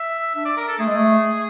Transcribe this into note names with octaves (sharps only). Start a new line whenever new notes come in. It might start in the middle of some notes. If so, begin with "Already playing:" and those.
Already playing: E5
D4 E5
D5
A#4
A4
A3 G#4
G#3
A3